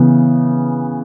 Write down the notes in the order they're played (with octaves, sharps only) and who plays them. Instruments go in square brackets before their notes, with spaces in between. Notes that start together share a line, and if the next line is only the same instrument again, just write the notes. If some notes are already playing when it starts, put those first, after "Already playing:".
Already playing: [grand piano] C#3 E3 B3